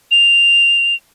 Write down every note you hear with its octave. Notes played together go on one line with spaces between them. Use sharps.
F7